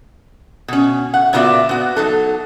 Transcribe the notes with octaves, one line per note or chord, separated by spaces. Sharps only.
B2 C#4
F#5
A#2 B3 F4 F#4 D5 E5
B3 F#4
F#3 D#4 A4